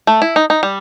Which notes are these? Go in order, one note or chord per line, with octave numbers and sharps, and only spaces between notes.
A3
E4
D#4
D#4
G3